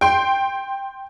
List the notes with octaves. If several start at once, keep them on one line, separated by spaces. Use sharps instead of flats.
G5 C6